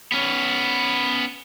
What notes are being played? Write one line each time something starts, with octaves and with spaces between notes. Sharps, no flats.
B3 C#4